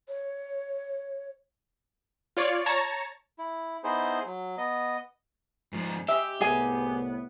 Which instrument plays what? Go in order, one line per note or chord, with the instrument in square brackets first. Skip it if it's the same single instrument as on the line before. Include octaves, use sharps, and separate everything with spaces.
[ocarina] C#5
[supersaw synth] F4 C#5 D5
C#5 A5 A#5 C#6
[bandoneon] E4
B3 D#4 E4 G#4 C5
F#3
B3 D#5
[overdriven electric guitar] G#2 F3
[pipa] G#3 E5 [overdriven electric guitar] G4
[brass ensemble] C2 A2 B3 [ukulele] G#4 G#5